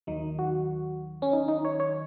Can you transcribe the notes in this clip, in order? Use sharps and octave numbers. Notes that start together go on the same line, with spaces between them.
D#2 D#3 F#3 D#4
F#4
C#4
D#4
D#4
C#5
C#5